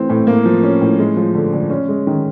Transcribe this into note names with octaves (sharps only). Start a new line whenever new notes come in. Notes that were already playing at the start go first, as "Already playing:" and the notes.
Already playing: E3 A3 C4
A2
A#3
F3
C#4
A2
G#3
F3
D3
D3
C#4
G#3
D#3